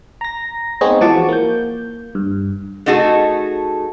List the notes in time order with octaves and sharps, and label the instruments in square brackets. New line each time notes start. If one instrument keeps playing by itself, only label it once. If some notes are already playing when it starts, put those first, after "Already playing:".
[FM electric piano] A#5 A#6
G#3 B3 C4 D#4 G#4 C#5
E3 F3 F#4 A5 C#6 D6
A#3 G6
G2
[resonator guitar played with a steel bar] A3 D#4 F#4 G#4 A4